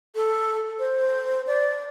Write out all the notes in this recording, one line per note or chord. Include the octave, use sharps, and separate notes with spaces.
A4
C5
D5